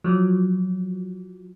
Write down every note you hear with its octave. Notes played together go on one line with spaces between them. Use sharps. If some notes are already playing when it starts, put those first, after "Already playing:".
F3 F#3